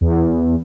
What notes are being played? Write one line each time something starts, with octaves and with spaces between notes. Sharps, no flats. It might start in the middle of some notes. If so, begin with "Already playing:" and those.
E2